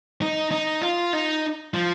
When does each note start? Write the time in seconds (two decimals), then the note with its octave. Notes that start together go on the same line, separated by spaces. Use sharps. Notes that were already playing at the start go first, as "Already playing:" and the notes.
0.22 D#4
0.51 D#4
0.82 F4
1.13 D#4
1.74 F3